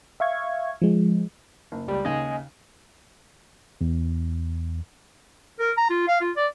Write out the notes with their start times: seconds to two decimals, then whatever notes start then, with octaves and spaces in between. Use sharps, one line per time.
0.20 E5 F5 C#6 G#6
0.82 F3 G#3
1.72 F#1
1.88 C#2 G3
2.05 D#2 C#3 D#5 G#5
3.81 E2
5.59 A#4
5.77 A#5
5.90 F4
6.08 F5
6.21 F4
6.36 D5